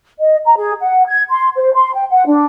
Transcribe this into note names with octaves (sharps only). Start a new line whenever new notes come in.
D#5
A#5
G#4
F#5
G#6
C6
C5
C6
G5
F#5
D4